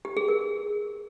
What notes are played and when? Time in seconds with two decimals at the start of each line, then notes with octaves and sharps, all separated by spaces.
0.05 G4
0.17 G#4
0.28 A#4